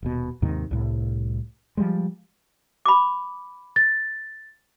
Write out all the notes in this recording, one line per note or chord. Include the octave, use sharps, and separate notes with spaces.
D#1 B2
D#2 G#2 C3 D#3
C2 A2
F3 G3 G#3
B5 D6
A6